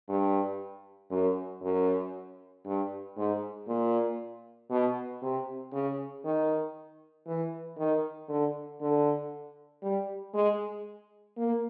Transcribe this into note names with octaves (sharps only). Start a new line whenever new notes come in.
G2
F#2
F#2
G2
G#2
A#2
B2
C3
C#3
D#3
E3
D#3
D3
D3
G3
G#3
A#3